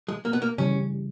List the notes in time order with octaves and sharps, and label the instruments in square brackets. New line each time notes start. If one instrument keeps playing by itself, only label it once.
[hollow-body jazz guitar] G#3
A#3
B3
A#3
[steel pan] C#3 E3 G3 [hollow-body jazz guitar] C#4